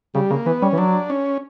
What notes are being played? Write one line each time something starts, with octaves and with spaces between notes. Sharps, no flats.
C#3 G3
C#3 A#3
E3 B3
G3 C#4
E3
F#3 D4
C#4